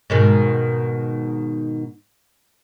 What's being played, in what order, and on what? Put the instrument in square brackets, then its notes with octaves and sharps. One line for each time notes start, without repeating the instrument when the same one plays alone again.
[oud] G#2 B2 D#3